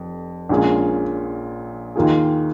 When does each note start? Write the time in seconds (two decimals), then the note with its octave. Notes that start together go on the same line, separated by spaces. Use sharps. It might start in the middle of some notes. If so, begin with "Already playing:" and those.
Already playing: F1 F2
0.49 A#1 A#2 G#3 C#4
1.96 D#2 D#3 A#3 F4 G#4